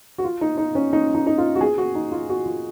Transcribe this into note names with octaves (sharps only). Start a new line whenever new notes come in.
F#4
F4
D#4
D#4
C#4
D#4
D#4
D#4
F4
F#4
G#4
F#4
D#4
F4
F#4
F4